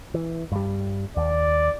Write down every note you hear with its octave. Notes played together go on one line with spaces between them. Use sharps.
E3
G2 G3
D#2 D5